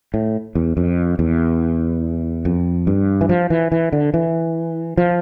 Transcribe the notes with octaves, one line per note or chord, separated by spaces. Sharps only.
A2
E2
F2
E2
F2
G2
E3
F3
E3
E3
D3
E3
F3